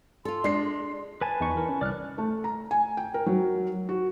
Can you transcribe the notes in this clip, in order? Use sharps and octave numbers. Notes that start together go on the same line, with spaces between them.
F4 A4 C6
G#3 D4 C7
B4 G#5 A5
E2 D#4 C#6
E3 A#4
C#4
C2 D5 F6 F#6
A3
A#5
G#5
G5
A#4
F#3
F#4